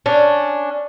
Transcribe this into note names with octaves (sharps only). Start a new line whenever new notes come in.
C#4 D4